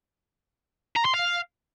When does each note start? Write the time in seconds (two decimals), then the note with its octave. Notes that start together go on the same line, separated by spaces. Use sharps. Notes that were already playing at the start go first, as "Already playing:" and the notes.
0.96 A#5
1.05 C6
1.14 F5